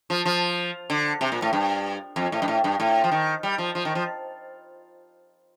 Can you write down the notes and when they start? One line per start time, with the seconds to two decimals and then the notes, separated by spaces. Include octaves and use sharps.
0.10 F3
0.25 F3
0.90 D3
1.21 C3
1.32 A#2
1.42 A2
1.53 G2
2.16 F2
2.32 A2
2.42 G2
2.48 A2
2.64 G2
2.80 A2
3.04 F3
3.12 D#3
3.43 G3
3.58 F3
3.75 F3
3.85 D#3
3.95 F3